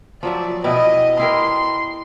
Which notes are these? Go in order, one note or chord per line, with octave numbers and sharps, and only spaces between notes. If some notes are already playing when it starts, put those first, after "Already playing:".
F3 F#3 D5 E5
B2 E4 D#5 G5
E4 G4 A#4 C6